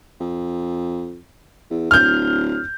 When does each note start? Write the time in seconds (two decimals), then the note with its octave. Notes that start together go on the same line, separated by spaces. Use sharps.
0.20 F2
1.70 E2
1.91 D1 F6 G6